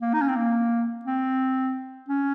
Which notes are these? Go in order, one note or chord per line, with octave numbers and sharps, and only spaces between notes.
A#3
D#4
C#4
C4
A#3
C4
C#4